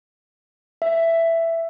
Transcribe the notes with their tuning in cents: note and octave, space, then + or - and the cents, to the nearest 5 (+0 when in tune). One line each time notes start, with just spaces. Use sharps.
E5 +10